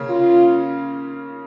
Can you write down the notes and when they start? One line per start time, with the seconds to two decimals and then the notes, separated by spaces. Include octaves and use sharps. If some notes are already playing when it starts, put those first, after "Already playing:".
Already playing: C#3 A#3 C#4
0.10 F4